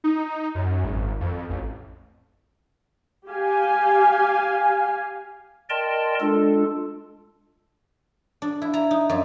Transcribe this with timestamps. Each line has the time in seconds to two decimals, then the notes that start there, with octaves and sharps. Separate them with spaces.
0.04 D#4
0.55 F#2
0.84 G#1
1.20 F2
1.50 A1
3.28 G4 F5 G#5
5.70 A#4 D5 D#5 G5 A5 C6
6.20 G#3 D4 F4 A4
8.42 D4
8.62 E4
8.74 A#5
8.91 D#4
9.10 F#2